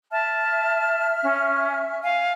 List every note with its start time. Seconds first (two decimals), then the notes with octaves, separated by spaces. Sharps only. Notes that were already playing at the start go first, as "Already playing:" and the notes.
0.12 E5 A5 F6
1.23 C#4
2.03 F5 G#5